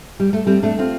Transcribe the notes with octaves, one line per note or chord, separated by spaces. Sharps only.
G3
A3
G3 C4
A3 D4
C4 F4